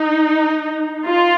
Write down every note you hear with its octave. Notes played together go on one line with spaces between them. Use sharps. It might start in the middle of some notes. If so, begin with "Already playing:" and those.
Already playing: D#4
F4